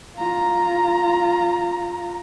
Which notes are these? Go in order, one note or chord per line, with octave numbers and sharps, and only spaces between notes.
F4 A#5